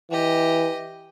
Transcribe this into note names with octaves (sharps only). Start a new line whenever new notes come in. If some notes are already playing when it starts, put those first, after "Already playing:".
E3 G4 D#5